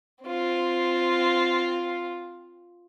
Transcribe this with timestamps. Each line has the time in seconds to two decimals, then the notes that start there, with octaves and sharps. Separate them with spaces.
0.23 C4 F4